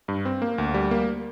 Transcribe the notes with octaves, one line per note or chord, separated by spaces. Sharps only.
G2
C4
A#3
D2
G3
A#3